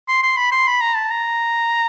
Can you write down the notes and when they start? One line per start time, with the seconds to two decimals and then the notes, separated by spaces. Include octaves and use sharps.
0.08 C6
0.23 C6
0.37 B5
0.52 C6
0.67 B5
0.81 A#5
0.96 A5
1.11 A#5